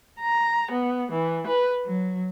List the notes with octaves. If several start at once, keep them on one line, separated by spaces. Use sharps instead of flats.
A#5
B3
E3
B4
F#3